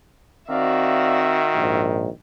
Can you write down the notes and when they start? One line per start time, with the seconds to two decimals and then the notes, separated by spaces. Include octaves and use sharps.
0.49 D#3 C4 F#4 D5 E5 F5
1.54 A#1 G#2